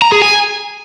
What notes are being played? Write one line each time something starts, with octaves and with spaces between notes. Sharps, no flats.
A#5
G#4
G#5